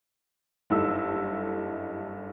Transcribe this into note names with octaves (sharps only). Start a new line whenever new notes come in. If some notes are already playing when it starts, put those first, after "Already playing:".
F#1 G2 D#4 E4 A4 E6